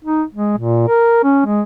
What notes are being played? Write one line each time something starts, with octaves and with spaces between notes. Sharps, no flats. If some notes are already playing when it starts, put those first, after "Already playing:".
D#4
G#3
A#2
A#4
C#4
G#3